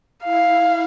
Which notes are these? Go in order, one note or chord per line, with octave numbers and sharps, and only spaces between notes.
E4 F5